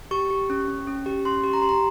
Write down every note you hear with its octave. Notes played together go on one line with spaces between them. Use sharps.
G4 C#6
G4
C#4
C#4
C#4
G4
C#4 C6
G4
A#5
G4 C6
A#5